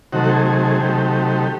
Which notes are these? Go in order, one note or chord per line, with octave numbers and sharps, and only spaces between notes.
C3 D#3 F#3 A3 F#4
A4
G#4
G#4
G#4
C3 D#3 F#3 A3 G4